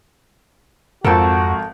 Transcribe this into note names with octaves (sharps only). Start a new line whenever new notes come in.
G#1 F2 F3 F#4 A4 A#4 A5